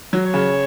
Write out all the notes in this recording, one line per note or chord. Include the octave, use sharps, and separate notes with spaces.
F#3
C#5
C#3